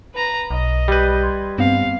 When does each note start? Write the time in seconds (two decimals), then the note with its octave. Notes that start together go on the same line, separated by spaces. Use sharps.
0.14 B4 A#5
0.51 B1 D#5
0.88 G3 G4 B4 G6
1.23 C6 G#6
1.58 G2 B3 C4 F5